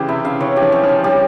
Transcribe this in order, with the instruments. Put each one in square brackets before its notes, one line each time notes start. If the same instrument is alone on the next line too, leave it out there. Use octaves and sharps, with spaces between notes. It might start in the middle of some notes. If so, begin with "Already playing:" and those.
Already playing: [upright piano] C#3 E3 [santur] G4 C5
[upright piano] C3 [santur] E4
[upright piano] C#3 [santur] F5
[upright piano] E3 [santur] C#5
[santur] G4
[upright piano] F3
[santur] C#4
[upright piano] F3
[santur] C#4
[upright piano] G3 [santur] G4